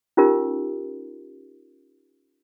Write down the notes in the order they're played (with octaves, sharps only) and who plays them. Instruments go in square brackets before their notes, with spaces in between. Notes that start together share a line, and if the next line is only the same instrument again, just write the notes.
[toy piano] C#4 D#4 F4 G4 A#4